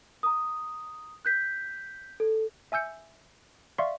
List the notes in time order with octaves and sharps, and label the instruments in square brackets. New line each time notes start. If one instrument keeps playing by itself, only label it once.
[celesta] A#5 D#6
F#6 G6 B6
A4
[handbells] E5 G#5 E6 G6 C#7
D5 E5 F5 C6 C#6